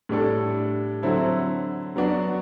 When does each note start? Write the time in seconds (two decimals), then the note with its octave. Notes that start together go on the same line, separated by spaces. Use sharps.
0.09 A2 G3 D4 A4
1.03 D3 F#3 C4 E4 A4
1.96 F#3 B3 D4 F#4